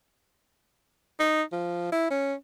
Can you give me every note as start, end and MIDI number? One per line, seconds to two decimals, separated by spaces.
1.19 1.42 63
1.52 1.90 53
1.92 2.09 64
2.10 2.34 61